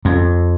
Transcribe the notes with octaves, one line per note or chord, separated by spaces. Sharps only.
F2